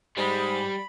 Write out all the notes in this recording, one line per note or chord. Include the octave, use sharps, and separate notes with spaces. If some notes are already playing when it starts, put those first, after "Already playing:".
G#2 G3 G#3 B5